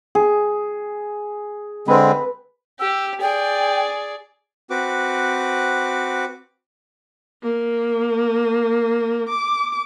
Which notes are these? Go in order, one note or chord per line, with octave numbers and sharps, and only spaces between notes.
G#4
D3 G#3 C4 B4
G4 E6
G#4 D5 G5
C4 F#4 B4 D6
A#3
D6